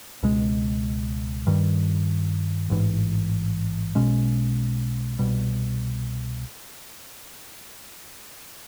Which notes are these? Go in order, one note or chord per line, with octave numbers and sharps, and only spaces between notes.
C#2 B2 G#3
G2 D#3 G3
A1 G#2 E3
B1 B2 G#3 C#4
C2 B2 G3